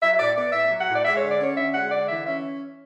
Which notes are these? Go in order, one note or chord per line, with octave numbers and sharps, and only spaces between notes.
F#3 E5
E5
A2 D5
B3 D5
A2 E5
F#3
F#5
A2
D5
G#3 E5
D3 C#5
D5
C#4 C#5
D3 E5
G#3 F#5
D3 D5
E3 E5
C#4 E5